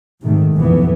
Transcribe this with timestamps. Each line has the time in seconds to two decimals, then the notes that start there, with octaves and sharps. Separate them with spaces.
0.21 G#2 C3 D#3 A3
0.56 B1 F2 E3 B3